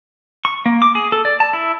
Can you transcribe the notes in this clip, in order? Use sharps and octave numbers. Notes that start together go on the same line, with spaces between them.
C#6
A#3
D6
G#4
A4
D5
A5
E4